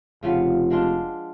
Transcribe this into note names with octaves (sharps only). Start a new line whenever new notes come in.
F1 C#3 F3 B3
G#3 D4 F4